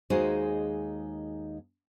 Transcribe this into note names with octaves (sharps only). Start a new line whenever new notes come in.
D#2 G#3 D#4 F#4 G#4 C5